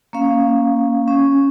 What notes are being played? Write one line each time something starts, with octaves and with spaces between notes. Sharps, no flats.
A#3 C#4 F5
C#4